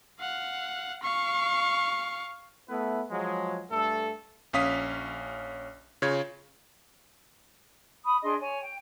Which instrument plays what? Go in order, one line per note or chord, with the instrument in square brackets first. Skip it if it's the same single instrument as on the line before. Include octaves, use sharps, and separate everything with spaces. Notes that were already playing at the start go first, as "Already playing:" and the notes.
[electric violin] F5 F#5
F5 C#6
[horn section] A3 B3 E4 B4
F3 F#3 G#3
G2 A3 A4
[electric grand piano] A#1 C#4 F5 D#6 B6
C#3 F4 C#5 G#6
[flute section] B5 D#6
D4 G#4 D#5 C6
C#5 G#5
G5